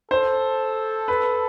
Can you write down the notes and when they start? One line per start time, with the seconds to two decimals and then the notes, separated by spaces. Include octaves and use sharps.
0.11 A4 C5
1.08 B4